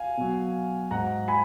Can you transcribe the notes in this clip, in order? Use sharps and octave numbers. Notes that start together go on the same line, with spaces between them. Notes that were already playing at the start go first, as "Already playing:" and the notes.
Already playing: F5 G#5
B2 F#3
G#2 F#3 F#5 A#5
G#5 B5